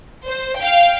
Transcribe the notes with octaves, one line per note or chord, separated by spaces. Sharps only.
C5
F5 G5